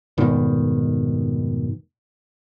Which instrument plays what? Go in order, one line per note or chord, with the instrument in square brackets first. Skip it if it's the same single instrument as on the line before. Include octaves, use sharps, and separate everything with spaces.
[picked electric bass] F1 G#2 B2 D#3